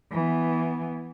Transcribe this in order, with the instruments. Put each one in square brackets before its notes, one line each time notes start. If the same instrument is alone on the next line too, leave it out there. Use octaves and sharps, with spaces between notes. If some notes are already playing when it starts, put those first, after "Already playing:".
[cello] E3 B3